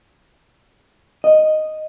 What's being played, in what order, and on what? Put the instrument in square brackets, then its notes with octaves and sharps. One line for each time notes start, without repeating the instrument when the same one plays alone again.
[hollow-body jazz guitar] D#5